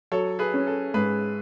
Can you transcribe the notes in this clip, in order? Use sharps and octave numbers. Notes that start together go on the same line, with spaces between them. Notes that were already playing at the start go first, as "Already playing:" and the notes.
F#3 A4 C#5
G#4 B4
C#4
A4
G#2 G#4 B4